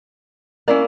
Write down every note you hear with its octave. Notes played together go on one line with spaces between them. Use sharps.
A#3 C#4 E4 D5